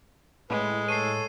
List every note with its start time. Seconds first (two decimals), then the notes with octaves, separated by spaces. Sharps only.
0.50 A2 G#3 B4
0.88 A4 C#5 E6 C7 D#7